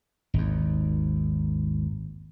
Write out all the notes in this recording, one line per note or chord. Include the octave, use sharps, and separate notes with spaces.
G#1 D#2